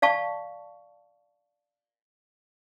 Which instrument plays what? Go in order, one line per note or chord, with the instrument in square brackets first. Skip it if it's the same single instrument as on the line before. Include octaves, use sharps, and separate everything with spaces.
[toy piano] D5 F5 A5 C#6